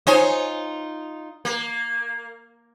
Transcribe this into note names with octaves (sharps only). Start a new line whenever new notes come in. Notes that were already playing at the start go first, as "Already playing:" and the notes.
D#4 F4 C5 C#5 D#5 G#5
A#3